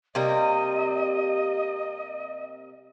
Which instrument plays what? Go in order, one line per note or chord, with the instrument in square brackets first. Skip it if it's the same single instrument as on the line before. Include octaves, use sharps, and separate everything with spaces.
[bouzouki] C3 G3 A#3 [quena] D#5